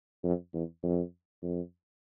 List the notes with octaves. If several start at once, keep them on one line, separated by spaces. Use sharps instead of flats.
F2
E2
F2
F2